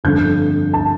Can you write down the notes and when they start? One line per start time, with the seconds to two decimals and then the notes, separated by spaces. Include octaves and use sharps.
0.04 G1 F2 D3 G6
0.74 A5